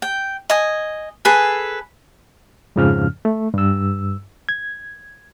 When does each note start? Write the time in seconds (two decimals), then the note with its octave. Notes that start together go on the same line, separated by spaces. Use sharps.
0.02 G5
0.50 D#5 G#5
1.25 G#4 A4 B4 G#5
2.76 F2 G#2 C#3 F3 C#4 F6
3.25 A3
3.54 G2 E6
4.49 G#6